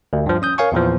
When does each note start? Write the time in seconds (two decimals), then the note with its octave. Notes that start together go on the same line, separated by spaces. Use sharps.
0.13 D2
0.26 G2 F3
0.42 C#4 D#6 G6
0.58 A#4 C#5 F5 G#5 C#6
0.72 E2 A#2 E3 F3